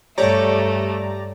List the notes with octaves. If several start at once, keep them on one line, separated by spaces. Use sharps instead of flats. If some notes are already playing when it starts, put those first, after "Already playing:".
G2 A3 G4 C#5 D5 A#5